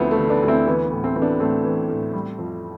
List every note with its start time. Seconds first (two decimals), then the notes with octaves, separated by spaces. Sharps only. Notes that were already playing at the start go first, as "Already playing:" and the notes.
Already playing: D2 D3 F3 A3 B3 C4 E4
0.11 A3
0.17 D3
0.30 B3 D4
0.43 D2
0.48 C4 E4
0.67 E3 B3
0.85 B3
0.91 A2
1.04 A3 C4
1.16 E3 C4
1.22 B3 D4
1.40 A2 A3 C4
1.64 E3
1.89 A2
2.14 G3
2.38 F2